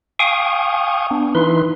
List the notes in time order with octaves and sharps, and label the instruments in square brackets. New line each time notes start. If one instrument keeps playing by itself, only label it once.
[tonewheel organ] F5 G5 G#5 C#6 D#6
B3 D4
E3 D#4 E4 B4 C6